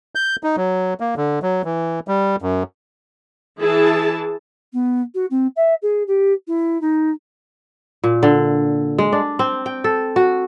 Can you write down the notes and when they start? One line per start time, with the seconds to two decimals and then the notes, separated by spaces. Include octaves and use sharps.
0.15 G6
0.43 D#4
0.57 F#3
1.00 A#3
1.17 D3
1.42 F#3
1.65 E3
2.08 G3
2.42 F#2
3.60 E3 E4 G#4 A5
4.73 B3
5.14 F#4
5.30 C4
5.56 E5
5.82 G#4
6.07 G4
6.47 E4
6.81 D#4
8.04 A#2
8.23 D3
8.98 G#3
9.13 D4
9.39 C4
9.66 G5
9.84 A4
10.16 F#4